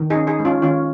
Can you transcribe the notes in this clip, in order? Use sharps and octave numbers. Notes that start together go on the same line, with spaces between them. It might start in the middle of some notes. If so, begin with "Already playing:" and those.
Already playing: D#3
D#4 G#4
C#4
D#4 G#4
G#3
C#4 F4
D#3 C#4 F4